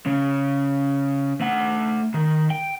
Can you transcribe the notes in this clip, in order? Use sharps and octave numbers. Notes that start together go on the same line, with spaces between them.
C#3
A3 F#5
D#3
G5